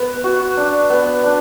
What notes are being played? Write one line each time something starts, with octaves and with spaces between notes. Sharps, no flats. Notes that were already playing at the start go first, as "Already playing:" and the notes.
Already playing: B3
F#4
D4
B3
D4